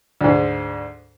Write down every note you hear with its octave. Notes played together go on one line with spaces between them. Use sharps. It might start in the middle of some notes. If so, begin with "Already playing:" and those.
D2 G#2